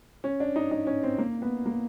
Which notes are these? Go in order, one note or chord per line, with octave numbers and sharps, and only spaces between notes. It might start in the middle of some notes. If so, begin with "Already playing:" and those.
C#4
D4
D#4
D#4
C#4
C4
A#3
B3
A#3